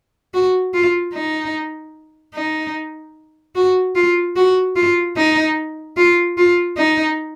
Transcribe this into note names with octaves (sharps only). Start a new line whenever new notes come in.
F#4
F4
D#4
D#4
F#4
F4
F#4
F4
D#4
F4
F4
D#4